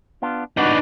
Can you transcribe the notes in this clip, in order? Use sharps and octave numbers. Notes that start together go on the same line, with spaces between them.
B3 D4 F4
G3 D4 D#4 F#4 B4 D5